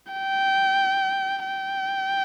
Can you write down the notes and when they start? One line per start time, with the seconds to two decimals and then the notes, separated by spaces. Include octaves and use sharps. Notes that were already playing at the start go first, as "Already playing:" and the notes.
0.13 G5
1.46 G5